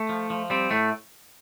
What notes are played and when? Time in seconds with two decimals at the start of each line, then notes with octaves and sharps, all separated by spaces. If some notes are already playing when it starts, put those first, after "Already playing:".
Already playing: A3
0.09 F3
0.30 F3
0.50 G3 C4
0.71 A2 A3